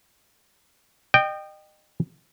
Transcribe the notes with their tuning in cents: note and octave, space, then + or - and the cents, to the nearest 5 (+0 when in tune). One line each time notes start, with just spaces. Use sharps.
D#5 -30 G5 +0